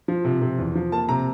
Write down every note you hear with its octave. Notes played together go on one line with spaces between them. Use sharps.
F3
C3
C3
E2
F3
A#3 A5
C3 A#5